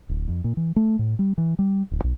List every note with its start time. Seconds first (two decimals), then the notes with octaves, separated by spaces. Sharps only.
0.09 D1
0.28 F2
0.44 A#2
0.57 E3
0.76 A3
0.99 A2
1.19 G3
1.38 E3
1.59 G3
1.91 D1
2.04 B1